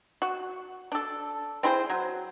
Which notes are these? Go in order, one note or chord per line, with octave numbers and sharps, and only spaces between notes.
F#4
D4 A4
C4 E4 G#4 C5
F#3